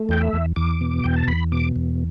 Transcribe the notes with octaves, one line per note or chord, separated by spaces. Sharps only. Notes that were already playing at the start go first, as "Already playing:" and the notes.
Already playing: A3
E2 G5
E5
E2
E2 D6
B2
E2 G5
A5
E2 B5
B2 D6
E2